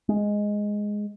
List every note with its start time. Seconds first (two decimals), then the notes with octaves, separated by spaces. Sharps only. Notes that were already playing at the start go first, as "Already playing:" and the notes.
0.09 G#3